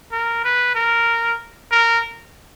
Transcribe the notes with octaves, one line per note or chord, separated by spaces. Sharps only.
A#4
B4
A#4
A#4